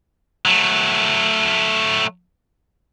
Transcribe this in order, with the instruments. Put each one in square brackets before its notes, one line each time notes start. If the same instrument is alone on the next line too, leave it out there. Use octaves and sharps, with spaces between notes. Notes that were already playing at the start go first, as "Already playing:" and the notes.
[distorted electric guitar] F#3 A3